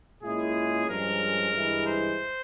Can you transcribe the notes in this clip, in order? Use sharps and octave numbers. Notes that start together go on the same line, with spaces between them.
A#2 G#3 C#4 E4 G#4
G2 F3 G#3 C#4 A#4
G2 E3 G#3 E4
C5